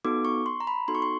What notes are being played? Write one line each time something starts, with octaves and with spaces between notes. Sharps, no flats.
B3 D#4 F#4 A4 D6
C#6
C6
A#5
B5
B3 D#4 F#4 A4 C6
C#6
C6